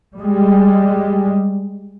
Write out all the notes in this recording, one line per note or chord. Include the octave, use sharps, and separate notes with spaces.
G3 G#3